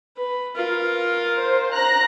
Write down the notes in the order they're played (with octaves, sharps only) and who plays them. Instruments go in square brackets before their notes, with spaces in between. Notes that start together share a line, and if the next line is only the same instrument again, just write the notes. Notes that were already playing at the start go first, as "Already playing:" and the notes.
[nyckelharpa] B4
F4 A#4
[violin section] C5
A#5 F#6 A#6